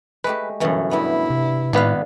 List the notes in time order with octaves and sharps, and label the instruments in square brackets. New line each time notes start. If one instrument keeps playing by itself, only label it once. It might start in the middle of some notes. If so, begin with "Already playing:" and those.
[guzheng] G#3 A3 G4 [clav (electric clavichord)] B4
[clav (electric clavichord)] G1 F#2 [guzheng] B2 E3 A3
[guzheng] G2 B3 [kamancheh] E4
[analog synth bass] C3
[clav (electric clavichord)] G#1 B3 B4 [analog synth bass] A2 [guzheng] D4 F5